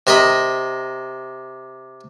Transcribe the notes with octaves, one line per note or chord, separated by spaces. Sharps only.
C3 A#4 D#5 B5